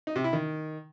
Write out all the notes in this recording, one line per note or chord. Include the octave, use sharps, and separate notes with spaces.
D#4
C3
E4
D#3